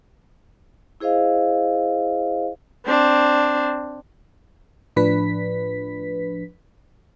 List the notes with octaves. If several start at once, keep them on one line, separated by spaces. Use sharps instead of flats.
E4 G#4 C5 D#5 F5
C4 D4
A2 F3 D4 B4 B6